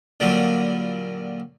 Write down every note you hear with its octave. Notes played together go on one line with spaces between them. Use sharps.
A#2 D3 F#3 G3